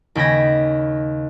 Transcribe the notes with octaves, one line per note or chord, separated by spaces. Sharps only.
D#2 C#3 G5 B5 G#6 A#6